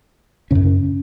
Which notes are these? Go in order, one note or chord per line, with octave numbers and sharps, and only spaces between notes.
F#2 C#3 C#4